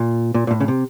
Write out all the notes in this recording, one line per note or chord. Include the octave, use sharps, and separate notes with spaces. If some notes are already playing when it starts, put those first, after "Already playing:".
Already playing: A#2
A#2
A#2
A2
C#3
C3